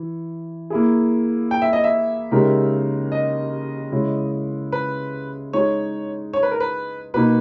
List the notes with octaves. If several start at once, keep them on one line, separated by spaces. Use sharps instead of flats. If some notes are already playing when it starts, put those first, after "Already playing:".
Already playing: E3
A#3 E4 G#4
G5
E5
D#5
E5
C#3 G#3 D#4 G4 A#4
D#5
C#3 G#3 C#4 E4
B4
G#3 D#4 G#4 C#5
C#5
B4
A#4
B4
B2 A#3 D#4 B4